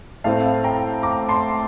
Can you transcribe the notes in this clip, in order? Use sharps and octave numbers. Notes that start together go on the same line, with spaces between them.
A2 A3 C4 F5 A5
G5 A#5
A#5 D6
A5 C6